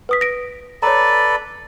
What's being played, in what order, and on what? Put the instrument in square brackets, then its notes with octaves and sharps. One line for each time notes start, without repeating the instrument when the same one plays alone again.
[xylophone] B4 D#6 B6
A#6 D7
[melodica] A4 B4 D5 [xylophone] C#5 A#5